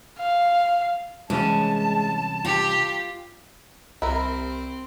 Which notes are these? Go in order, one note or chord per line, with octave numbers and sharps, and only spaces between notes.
F5
C2 E3 G#3 C#4 A5
F4 G4
C2 C4 E4 A#4